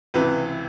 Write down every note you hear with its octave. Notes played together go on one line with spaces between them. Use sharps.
C#2 C3 E3 B4